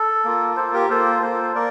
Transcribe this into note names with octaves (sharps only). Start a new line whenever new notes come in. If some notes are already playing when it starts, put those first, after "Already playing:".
Already playing: A4
A#3 F4
A#3 F4 A4 C5
G4 A#4
A#3 F4 A4 C5
A#3 F4 A4 C5
A#3 A#4 D5